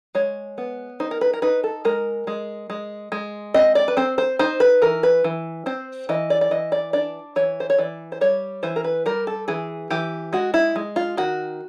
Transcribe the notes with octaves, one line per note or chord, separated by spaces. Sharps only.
G#3 C#5
B3
D#4 C5
A#4
B4
A#4
D#4 B4
A4
G#3 A#4
G#3
G#3
G#3
C4 D#5
D5
B4
C4 C5
C5
D#4 C5
B4
E3 A#4
B4
E3
C4 C5
E3 D#5
D5
D5
E3 D#5
D5
D4 D5
E3 C#5
C5
C#5
E3 D5
C5
G3 C#5
E3 C5
A#4
B4
G3 A#4
A4
E3 G#4
E3 G4
G#3 F#4
E4
G#3
F4
D#3 F#4